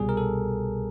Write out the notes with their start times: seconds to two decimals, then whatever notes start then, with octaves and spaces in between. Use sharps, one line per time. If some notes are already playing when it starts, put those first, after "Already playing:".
Already playing: C2 B2 G3 G#4
0.09 A#4
0.17 A4